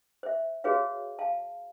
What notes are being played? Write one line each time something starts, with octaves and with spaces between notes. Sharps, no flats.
C5 E5
F#4 G#4 B4 C#5 F5
F5 A5